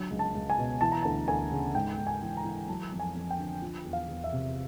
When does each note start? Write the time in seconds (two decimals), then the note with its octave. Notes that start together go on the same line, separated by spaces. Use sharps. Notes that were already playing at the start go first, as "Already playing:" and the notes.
Already playing: D3 F#3
0.11 C#2
0.19 A5
0.35 C#2
0.50 G#5
0.58 B2
0.81 E3 A5
0.92 A#5
1.03 D2 A5
1.28 D2 G#5
1.52 C#3
1.75 G#2 G5
1.98 G#2
2.07 G#5
2.22 E3
2.37 A#5
2.44 E3
2.68 F#3 A5
2.92 F2
3.00 G#5
3.15 F2
3.30 G5
3.38 D3
3.62 F3
3.85 E2
3.93 F5
4.08 E2
4.24 E5
4.32 C3